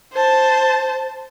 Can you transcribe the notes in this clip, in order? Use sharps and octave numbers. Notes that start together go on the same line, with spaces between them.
C5 A5